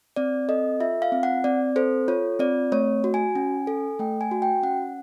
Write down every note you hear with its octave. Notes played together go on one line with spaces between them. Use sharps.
C4 D5
A4 D#5
F4 E5
F5
C4
F#5
C4 D5
A4 C5
F4 C#5
C4 D5
A3 C#5
F#4
G#5
C#4
A4
A3 G5
G#5
F#4
G5
C#4 F#5